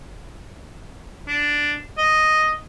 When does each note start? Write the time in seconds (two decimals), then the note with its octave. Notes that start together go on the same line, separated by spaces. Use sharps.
1.28 D4
1.98 D#5